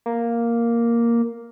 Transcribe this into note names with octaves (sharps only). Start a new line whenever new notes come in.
A#3